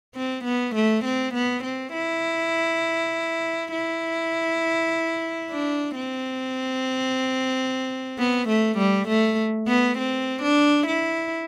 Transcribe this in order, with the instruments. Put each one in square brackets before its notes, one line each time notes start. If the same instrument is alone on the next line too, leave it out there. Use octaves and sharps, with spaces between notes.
[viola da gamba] C4
B3
A3
C4
B3
C4
E4
E4
D4
C4
B3
A3
G3
A3
B3
C4
D4
E4